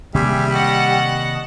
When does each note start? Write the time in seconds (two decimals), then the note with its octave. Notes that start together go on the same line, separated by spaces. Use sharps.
0.14 C3 D#3 G3 A#3 G4 G#4 E5
0.54 D#5 F#5 A5 C#6